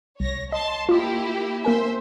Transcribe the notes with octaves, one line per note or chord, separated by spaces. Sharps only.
C2 C#5 A#6
D#5 A5 C6
A#3 E4 F4 G4 D6
A#3 A#4 C5 E5 G#5